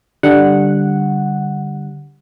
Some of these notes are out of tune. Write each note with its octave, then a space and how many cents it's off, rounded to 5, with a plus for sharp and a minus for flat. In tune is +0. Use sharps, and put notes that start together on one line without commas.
D3 +0 G3 +0 F#5 -5